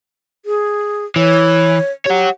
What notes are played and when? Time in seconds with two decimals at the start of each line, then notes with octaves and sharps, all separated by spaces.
0.46 G#4
1.16 E3 C#5
2.06 G4 C#5 F#5